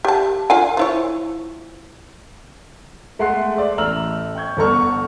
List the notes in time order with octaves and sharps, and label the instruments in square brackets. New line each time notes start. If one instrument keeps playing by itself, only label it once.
[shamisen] G4 A5
F4 F5 G#5
F3 E4 C#5
[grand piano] G#3 A3 F#5 C6 F#6 C7
D5 E5
A1 A3 A#5 E6 F6 F#7
G5 C#6 G6 G#6
G1 D3 A4 A#5 C#6 F6